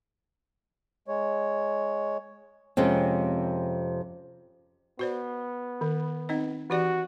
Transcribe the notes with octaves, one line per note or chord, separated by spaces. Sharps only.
G#3 C#5
F2 C3 G#3 C4 C#4
B3 F#4 C5 D5
D#3
C4 D#4 D#5
E3 F#4 G4 D5